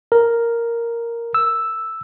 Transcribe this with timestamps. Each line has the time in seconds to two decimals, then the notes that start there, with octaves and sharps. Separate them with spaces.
0.12 A#4
1.34 E6